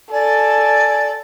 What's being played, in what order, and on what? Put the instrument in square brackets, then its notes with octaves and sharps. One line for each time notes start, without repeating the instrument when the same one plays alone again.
[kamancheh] A4 [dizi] D5 [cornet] G#5